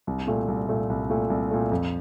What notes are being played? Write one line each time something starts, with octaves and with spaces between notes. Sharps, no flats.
C2
A#2 A3
C2
A#2 A3
C2
A#2 A3
C2
A#2 A3
F2